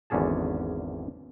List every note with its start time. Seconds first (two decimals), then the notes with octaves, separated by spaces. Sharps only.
0.10 G#1 E2 D3 C#4 G#4 A5